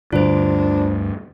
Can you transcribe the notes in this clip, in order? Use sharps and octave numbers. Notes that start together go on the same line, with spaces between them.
D2 G2 D3 D4 F4 C5